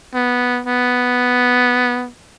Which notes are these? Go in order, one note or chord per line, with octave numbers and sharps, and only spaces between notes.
B3
B3